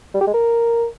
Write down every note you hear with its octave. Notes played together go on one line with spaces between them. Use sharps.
G3
G4
G#3
A#4